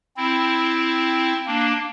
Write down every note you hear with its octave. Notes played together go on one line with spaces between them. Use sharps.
C4 E4
A#3 D4